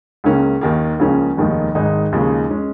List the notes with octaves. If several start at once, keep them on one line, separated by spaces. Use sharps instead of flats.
C#2 C#3 A#3 C#4
D#2 D#3 A#3
C#2 C#3 F3 A#3 C#4
F1 D#2 D#3 G#3 D#4
G#1 G#2 D#3 G#3 D#4
D#2 C#3 F3 G#3 D#4
G#3 C#4